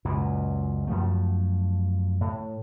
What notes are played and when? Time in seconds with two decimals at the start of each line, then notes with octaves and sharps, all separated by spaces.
0.05 C#2 F#2 A#2
0.87 F#2 F3 A3
2.21 A2